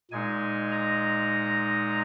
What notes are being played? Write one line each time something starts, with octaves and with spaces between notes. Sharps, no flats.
A#2 G#3 D#4 G#5
A#5